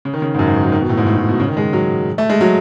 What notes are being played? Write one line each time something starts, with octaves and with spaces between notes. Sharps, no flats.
C#3
D#3
C#3
G#2
F#2
G#2
D#3
F#3
D#3
B2
A2
G#2
A2
A2
B2
C#3
D#3
G#3
F#3
A3
G#3
F#3